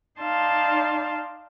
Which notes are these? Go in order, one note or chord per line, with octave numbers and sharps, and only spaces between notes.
D#4 D5 F5 A5 C6